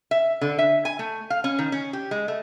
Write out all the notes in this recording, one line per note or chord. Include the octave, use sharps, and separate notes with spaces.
E5
D3
E5
G#5
A3
F5
C#4
D#3
C#4
G4
G#3
A3